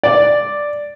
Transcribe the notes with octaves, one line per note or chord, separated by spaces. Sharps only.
D5